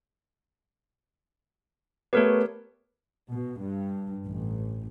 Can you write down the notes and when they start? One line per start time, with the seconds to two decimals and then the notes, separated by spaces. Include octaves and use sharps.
2.13 A3 B3 G4 A#4 C#5
3.31 B2
3.60 G2
4.26 A1